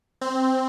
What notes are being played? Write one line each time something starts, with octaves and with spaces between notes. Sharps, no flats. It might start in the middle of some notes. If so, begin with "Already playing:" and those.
C4